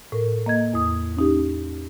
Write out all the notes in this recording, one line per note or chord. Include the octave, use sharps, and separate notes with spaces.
A2 A#4
A#3 D#5 G#6
E2 D#6
C#4 D#4 G4